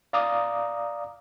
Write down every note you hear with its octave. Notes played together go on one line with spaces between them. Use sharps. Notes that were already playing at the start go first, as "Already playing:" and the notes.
D5 F5 A#5 D6 D#6